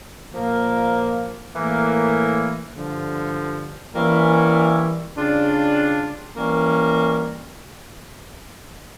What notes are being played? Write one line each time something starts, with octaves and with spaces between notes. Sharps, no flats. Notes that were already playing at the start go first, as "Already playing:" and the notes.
A#2 F3 A#3
A2 E3 A#3
G2 D3 F3
E3 G3 A#3 C#4 E4
C#3 G3 D4 F4
E3 G3 A#3 C#4